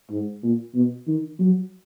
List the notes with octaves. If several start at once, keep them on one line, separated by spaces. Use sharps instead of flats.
G#2
A#2
B2
D#3
F#3